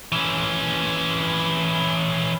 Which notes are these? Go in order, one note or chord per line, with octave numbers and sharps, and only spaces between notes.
E3 C#4